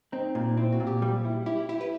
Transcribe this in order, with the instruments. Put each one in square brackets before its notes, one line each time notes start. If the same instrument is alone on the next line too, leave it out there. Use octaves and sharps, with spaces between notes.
[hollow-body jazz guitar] C4 [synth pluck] D#4
[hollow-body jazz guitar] A#2
[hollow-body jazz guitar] C4 [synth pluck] E4
[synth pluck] F#4
[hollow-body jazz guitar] A#2
[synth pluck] G4
[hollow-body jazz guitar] G3
E4
[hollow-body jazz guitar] E4 [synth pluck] G4
[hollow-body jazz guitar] E4 [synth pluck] G4
[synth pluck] B4